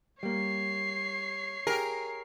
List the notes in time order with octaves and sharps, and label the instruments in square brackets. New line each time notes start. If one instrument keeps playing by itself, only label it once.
[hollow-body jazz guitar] G3 A#3 [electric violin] C#5 C7
[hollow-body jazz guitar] G4 G#4 [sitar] A#4